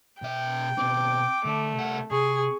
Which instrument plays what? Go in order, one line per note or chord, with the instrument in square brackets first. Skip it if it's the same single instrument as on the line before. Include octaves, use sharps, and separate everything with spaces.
[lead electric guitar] B2 E5 [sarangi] G5
[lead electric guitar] B2 C4 [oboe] D6
[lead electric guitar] D3 [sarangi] A3
[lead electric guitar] C2 F#5
[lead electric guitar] C3 [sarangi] G#4 [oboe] C#6